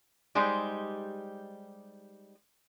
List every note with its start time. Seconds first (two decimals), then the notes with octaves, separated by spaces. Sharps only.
0.35 G3 G#3 D#4 G4 C5 D#5